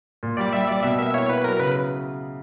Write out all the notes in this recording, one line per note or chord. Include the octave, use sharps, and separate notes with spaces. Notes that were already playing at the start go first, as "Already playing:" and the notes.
A#2
G3 D5
G3 E5
G3 D5
B2 E5
A#3 E5
E4 C#5
E4 B4
F#3 A#4
C#3 B4